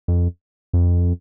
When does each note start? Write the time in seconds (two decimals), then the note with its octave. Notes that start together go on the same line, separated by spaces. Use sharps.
0.08 F2
0.73 F2